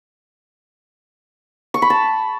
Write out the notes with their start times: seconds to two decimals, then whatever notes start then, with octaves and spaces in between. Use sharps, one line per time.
1.74 C#6
1.82 B5
1.90 A5